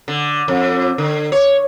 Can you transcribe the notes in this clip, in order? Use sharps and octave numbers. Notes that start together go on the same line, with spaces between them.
D3
F2
D3
C#5